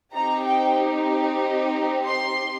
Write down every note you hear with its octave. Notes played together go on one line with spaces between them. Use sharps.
C4 D#4 G4 A#5
G5
C6